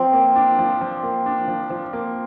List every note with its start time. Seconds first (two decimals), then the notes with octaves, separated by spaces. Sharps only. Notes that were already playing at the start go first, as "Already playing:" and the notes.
Already playing: F3 C4
0.13 A#3
0.36 D4
0.59 F3
0.81 F3
1.03 A#3
1.26 D4
1.48 F3
1.70 F3
1.93 A#3